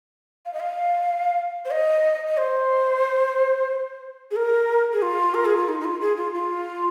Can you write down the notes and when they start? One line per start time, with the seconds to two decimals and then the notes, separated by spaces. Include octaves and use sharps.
0.46 F5
0.54 D#5
0.60 F5
1.65 C5
1.71 D#5
2.28 D#5
2.37 C5
4.31 G#4
4.36 A#4
4.93 G#4
5.02 F4
5.34 A#4
5.45 G#4
5.57 F4
5.68 D#4
5.80 D#4
5.84 F4
6.01 G#4
6.17 F4
6.34 F4